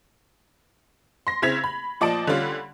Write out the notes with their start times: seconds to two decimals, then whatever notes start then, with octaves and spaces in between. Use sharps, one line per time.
1.27 C6 A#6
1.42 C#3 C4 E4 G#6 B6 F7
1.64 B5
2.01 A#2 F3 D5 D#5 A5 D7
2.27 D3 G3 C#4 F4